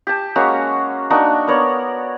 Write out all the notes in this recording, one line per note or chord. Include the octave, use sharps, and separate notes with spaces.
G4 A5
G#3 A#3 C#4 F#4
A#3 D4 D#4 F#4
B3 A#4 C#5 D5